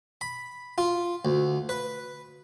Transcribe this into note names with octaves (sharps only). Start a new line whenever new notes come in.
B5
F4
D2
B4